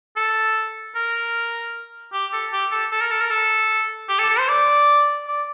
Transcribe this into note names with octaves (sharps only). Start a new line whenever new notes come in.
A4
A#4
G4
A4
G4
A4
A4
A#4
A4
A#4
A4
G4
A4
A4
C5
D5
D5